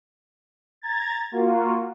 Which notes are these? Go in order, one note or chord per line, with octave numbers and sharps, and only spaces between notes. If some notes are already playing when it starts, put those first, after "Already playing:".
A#5 G#6 A6
A#3 F4 F#4